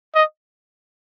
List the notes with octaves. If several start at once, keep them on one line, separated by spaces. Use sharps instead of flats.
D#5